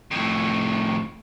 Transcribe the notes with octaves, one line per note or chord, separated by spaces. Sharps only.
F2 A2